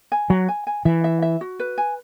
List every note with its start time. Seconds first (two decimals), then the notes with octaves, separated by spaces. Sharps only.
0.12 G#5
0.30 F#3 F#4
0.48 G#5
0.67 G#5
0.85 E3 E5
1.04 E5
1.22 E5
1.41 F#4
1.60 B4
1.78 G#5